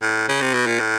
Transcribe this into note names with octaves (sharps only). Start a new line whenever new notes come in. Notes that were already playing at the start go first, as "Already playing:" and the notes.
A2
C#3
C3
B2
A#2
A2